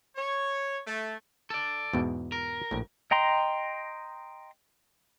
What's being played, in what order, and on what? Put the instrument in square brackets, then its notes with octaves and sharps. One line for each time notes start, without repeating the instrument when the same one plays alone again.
[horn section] C#5
A3
[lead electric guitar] A4 D5
[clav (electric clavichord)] E2 G#2 B2
[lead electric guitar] A#4
[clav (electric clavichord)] A#1 A2
[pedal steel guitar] D#5 G5 A#5 C6